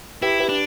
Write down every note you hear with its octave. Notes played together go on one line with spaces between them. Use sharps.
E4 G4 B4
G4 B4
D4